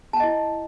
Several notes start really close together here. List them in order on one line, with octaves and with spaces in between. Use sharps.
A5 G5 D#5 E4